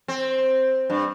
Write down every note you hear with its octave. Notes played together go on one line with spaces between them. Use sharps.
C4
G2